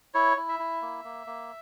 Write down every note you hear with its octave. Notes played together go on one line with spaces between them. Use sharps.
E4 C#5
E4
E5
E4
A#3
A#3
A#3